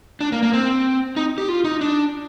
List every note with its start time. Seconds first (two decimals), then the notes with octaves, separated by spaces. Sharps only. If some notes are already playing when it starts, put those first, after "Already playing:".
0.21 D4
0.32 A#3
0.43 A#3
0.53 C4
1.16 D#4
1.38 G4
1.49 F4
1.64 D#4
1.81 D4